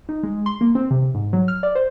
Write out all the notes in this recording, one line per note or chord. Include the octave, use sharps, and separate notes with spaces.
D#4
G#3
C6
A#3
C4
C3
C3
G#2
F#3
F6
D5
C5